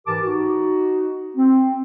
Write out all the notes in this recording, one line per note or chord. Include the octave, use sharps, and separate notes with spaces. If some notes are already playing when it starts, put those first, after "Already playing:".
G#2 E3 G4 A#4 A5 D6
D#4 F#4
C4